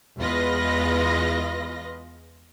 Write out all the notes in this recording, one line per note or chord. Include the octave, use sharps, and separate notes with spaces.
E2 G#3 F4 B4 D#5 A#6